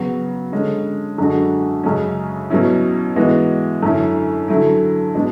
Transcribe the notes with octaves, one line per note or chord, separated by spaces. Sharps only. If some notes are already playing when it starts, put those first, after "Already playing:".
Already playing: C#3 F#3 B3 F#4
D3 G#3 C#4
F#2 D3 G#3 D4 F#4
F#2 C#3 G#3 C#4
B2 F#3 C#4 E4
E3 G#3 B3 F#4
F#2 D3 A3 C#4 E4
D3 F#3 A3 E4
B2 G#3 D4